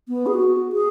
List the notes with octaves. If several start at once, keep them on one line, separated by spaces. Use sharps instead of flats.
B3
G#4
F#4
G#4